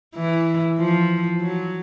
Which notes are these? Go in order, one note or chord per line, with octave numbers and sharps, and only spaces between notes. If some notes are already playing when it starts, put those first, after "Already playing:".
E3
F3
F#3